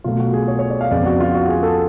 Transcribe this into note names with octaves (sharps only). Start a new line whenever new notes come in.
B2 F#3 A3 F4
F#4
G#4
C#5
C#5
D5
F5
F2 C#3 G#3 B3 D5
F#4
F4
F#4
G#4
A4